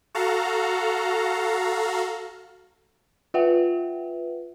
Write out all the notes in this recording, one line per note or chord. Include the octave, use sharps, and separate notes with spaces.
F#4 A4 F5 A#5
F4 B4 E5 F#5 G5